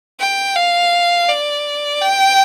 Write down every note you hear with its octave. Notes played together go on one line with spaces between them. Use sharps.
G5
F5
D5
G5